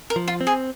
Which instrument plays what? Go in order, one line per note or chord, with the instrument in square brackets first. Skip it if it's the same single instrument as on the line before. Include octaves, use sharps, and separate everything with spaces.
[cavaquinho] A#4
[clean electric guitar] F3
[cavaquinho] F4
[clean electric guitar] C4
[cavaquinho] G#4